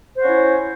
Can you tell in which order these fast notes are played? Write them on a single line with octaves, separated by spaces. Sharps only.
C5 F#4 C#4 E4